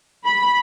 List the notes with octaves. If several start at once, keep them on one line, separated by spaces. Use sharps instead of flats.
B5